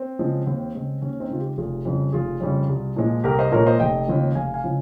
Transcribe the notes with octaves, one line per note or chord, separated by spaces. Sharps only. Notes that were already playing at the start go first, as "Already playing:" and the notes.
Already playing: C4
C#3 F3 G#3
D#2
C#3 G#3
D#2 C#4
C4 D#4
C#3 G#3 F4
D#4 G4
F1 F4 G#4
F2 C#3 G3
F1 F4 G#4
F2 C#3 G3
C2
A#2 F3 G#3
C2 G4 A#4
C5 D#5
A#2 F3 G#3 A#4 C#5
C5 D#5
F1 D#5 G5
D#2 C#3 F3 G#3
F1 F5 G#5
F5 G#5
C#3 F3 G#3